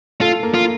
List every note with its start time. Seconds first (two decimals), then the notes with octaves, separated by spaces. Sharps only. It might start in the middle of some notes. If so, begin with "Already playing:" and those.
0.21 A3 F4 A4
0.43 A#3 A#4
0.54 F4